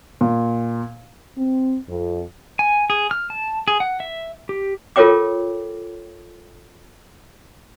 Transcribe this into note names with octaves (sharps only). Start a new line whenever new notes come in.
A#2
C4
F2
G#5
G#4
F6
A5
G#4
F#5
E5
G4
F4 A4 A#4 C#5 G5 D6